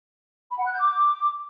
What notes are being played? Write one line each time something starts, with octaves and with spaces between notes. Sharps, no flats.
B5
F#5
F#6
G6
D6